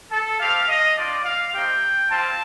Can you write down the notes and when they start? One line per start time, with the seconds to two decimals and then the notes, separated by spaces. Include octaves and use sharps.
0.12 A4
0.40 A3 C4 G4 F5
0.68 D#5
0.96 G3 D4 F4 D5
1.25 F5
1.54 A3 C4 D#4 G4 G5
2.10 G3 C4 F4 A5